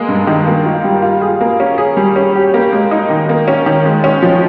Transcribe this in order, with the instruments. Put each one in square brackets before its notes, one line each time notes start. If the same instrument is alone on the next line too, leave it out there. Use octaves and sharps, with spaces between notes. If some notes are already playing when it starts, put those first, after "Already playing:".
Already playing: [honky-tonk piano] G#3 A#3
G2
D#3
A#3
F4
G3
F4
G#4
A#3
C#4
G#4
G3
C#4
G4
A#3
G#3
D#4
D#3
A#3
C#4
D#3
G#3
C#4
F3